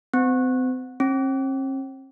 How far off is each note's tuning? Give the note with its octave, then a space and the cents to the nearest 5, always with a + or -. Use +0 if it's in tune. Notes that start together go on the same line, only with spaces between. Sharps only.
C4 -40
C4 +45